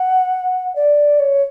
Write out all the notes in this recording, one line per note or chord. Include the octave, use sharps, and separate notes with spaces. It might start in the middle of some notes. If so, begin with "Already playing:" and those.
Already playing: F#5
D5
C#5